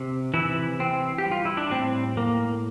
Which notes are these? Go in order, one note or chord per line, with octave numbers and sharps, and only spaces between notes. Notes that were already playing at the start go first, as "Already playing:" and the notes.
Already playing: C3
C3 E3 E4
E3 C4
G4
G3
F4
E4
D4
A2 C4
A2 A#3